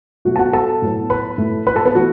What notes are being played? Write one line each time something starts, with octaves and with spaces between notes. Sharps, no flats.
B2 F#3 A3 F#4
A5
F#4 F#5
A4 A5
A2 F#3 B3
B4 B5
A2 A3
B4 B5
A4 A5
B3 B4
E3 A3 F#4